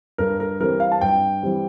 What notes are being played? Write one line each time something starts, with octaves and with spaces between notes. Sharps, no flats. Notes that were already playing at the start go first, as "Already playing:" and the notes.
G2 A#4
A#4
E3 G3 C4 A#4
F5
A5
G2 G5
E3 G3 C4